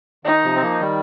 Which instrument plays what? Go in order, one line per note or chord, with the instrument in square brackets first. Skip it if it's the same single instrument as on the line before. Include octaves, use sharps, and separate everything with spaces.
[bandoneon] D#3 [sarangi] D#4
[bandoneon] C3 F3
C4
F3 A#3
D#3 G3